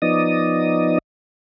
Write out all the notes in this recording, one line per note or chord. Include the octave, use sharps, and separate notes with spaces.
F3 B3 D#4 D5 D#5 D#6